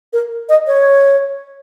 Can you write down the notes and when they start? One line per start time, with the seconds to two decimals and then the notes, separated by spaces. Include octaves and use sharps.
0.13 A#4
0.49 D#5
0.67 C#5